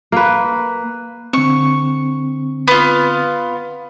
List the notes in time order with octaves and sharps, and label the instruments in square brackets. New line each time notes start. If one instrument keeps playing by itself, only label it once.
[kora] A#3 B4
[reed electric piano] D3 C4 [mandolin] C#6
[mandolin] B3 F4